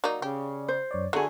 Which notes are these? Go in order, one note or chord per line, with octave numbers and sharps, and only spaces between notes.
F#3 A#3 D#4 D5
C#3 G4
C5
F#2 C#5 D5
D3 F#3 A3 G#4 A4 C#5 C6